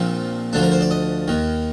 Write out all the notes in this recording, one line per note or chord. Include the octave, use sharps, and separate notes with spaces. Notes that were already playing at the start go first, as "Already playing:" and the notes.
Already playing: A#1 A#2 F3 C4
D2 D3 F3 D4
A#4
C5
D5
D#5
D#2 D#3